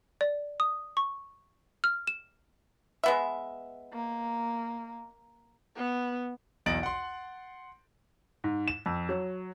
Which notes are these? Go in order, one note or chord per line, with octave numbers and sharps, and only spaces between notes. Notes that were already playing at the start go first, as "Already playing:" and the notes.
D5
D#6
C#6
F6
E7
G#3 B3 E5
A#3
B3
B1 E2 D#5 A6 D7 F#7
F#5 C6
G#2
E7
F2
F#3